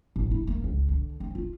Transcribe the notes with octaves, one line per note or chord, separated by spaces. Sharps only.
A1
E4
A#3
C#2
D3
C4
F4